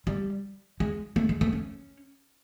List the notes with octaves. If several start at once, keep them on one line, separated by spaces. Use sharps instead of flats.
G3
G#3
A3
G#3
A3
C#4